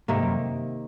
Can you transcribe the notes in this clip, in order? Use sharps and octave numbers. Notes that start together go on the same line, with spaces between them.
G#2 C3 D#3 A#3
F#2